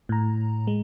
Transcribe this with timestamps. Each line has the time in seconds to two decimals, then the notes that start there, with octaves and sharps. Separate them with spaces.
0.09 A2 A#5
0.67 G#3